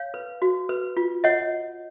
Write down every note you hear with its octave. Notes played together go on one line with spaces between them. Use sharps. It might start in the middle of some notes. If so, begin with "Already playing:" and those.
Already playing: C#5 F5
B4
F#4
B4
F4
C#5 D#5 F#5